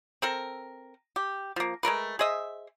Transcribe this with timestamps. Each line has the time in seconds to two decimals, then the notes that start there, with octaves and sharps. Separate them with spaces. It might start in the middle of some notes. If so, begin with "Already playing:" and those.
0.22 C4 A4 A#4
1.16 G4
1.56 F3 A#3
1.83 G#3 A3 A#4 B4
2.19 G#4 C5 D#5 E5